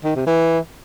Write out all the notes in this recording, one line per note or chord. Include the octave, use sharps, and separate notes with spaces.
D#3
C3
E3